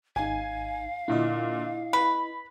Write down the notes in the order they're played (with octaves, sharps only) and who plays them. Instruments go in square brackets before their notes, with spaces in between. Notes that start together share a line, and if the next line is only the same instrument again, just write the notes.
[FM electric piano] G#1 D#4 [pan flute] F5 [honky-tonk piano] G#5
[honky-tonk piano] A#2 D3 [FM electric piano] E4 D#5
[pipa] B4 [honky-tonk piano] B5